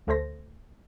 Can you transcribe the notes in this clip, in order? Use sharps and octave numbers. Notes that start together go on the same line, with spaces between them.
D2 A3 A4 C5 A#6